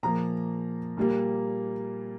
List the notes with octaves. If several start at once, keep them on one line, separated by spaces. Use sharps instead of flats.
A#2 F3 A#3 A#5
A#2 G3 A#3